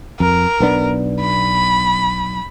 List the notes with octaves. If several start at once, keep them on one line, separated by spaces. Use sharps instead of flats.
F2 A#4
B1 B3 D4
B5